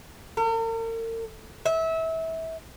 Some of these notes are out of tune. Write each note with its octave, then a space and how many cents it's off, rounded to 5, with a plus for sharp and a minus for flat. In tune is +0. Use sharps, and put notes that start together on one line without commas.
A#4 -45
E5 -25